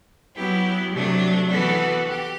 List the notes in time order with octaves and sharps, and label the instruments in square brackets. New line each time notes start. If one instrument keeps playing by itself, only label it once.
[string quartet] F#3 B3 E4 G4
C3 F#3 A3 D4
E3 B3 F#4 A4
G4